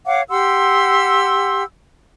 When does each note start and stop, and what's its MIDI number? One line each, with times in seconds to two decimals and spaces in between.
0.06 0.22 73
0.06 0.22 77
0.06 0.22 78
0.06 0.22 86
0.29 1.64 67
0.29 1.64 78
0.29 1.64 84
0.29 1.64 88